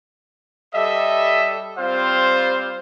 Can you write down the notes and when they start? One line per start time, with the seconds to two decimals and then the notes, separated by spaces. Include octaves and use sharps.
0.74 G3 A4 D#5 E5
1.78 G3 C4 F4 C5 F5